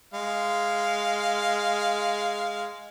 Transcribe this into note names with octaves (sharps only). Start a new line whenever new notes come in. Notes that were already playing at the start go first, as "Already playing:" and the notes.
G#3 F5